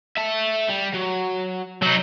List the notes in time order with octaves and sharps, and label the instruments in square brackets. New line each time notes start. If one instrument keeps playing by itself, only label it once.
[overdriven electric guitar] E5 A5
G3
F#3
[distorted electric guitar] F#3 D#4